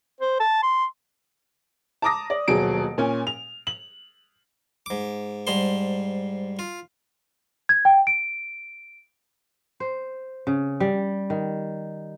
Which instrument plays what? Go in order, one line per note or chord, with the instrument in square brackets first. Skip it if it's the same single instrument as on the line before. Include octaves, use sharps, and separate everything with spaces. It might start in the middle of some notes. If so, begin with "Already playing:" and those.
[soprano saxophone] C5
A5
C6
[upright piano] A5 A#5 D6 D#6 A#6
D5
D#1 B2 F#3 G#4 D7
A#2 C#4 G#5
F7
F#7
[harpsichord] G#2 D6
G#2 G3 C5 C6
F4
[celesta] G#6
G5
D7
[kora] C5
C#3
G3
D#3